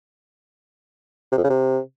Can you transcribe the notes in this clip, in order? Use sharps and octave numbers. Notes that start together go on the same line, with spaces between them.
C3
F2
C#3
C3